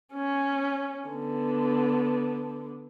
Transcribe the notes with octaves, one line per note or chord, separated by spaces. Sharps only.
C#4
D3 B3